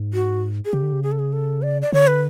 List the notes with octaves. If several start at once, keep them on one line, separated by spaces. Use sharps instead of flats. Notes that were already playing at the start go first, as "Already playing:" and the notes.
Already playing: G#2
F#4
G#4
C#3 G4
D3
C#3
G#4
A4
G#4
A4
D5
D5
D3 C#5
B4